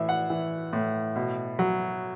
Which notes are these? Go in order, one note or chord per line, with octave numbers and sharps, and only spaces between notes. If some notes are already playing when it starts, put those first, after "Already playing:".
Already playing: A2 E3 E5
F#5
E3
A2
B2
F#3